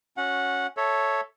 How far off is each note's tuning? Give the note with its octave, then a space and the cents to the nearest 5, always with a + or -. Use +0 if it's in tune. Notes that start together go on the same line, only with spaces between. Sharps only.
C#4 +0 F#4 -15 F#5 -15
A4 +0 C#5 +0 E5 +0